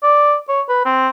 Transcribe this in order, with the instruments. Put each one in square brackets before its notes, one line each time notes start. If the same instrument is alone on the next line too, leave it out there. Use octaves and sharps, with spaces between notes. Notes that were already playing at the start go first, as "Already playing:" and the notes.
[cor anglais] D5
C#5
B4
C4